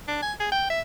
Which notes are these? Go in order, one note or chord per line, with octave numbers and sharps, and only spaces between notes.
D4
G#5
G#4
G5
E5